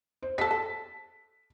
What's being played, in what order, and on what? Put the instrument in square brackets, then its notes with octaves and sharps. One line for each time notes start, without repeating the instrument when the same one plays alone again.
[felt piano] C5
[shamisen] G#4 A4 [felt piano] B6
[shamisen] A4